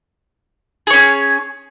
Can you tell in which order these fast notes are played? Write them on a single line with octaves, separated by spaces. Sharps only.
G#4 C#5 C#4